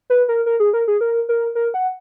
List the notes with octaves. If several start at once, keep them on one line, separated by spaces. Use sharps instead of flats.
B4
A#4
A#4
G#4
A#4
G#4
A#4
A#4
A#4
F#5